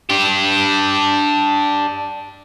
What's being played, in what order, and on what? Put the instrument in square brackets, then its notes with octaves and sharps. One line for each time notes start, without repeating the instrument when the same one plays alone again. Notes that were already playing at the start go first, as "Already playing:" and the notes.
[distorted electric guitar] D4 G4